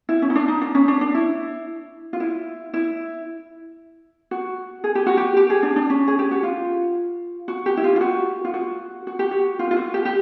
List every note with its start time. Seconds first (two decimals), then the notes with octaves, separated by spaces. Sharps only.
0.09 E4
0.22 C#4
0.30 D#4
0.35 D4
0.48 D#4
0.62 D4
0.75 C#4
0.88 D4
1.01 D4
1.14 E4
2.13 F4
2.20 E4
2.74 E4
4.31 F#4
4.84 G#4
4.95 G4
5.06 F#4
5.17 G4
5.37 G4
5.50 G#4
5.63 D4
5.76 D4
5.90 C#4
6.08 G#4
6.19 G4
6.31 F#4
6.43 F4
7.48 F#4
7.66 G4
7.77 E4
7.84 F4
7.96 F4
8.01 F#4
8.45 F4
8.54 F#4
9.07 F#4
9.19 G4
9.31 F#4
9.59 F4
9.71 F4
9.77 F#4
9.94 G4
10.05 G4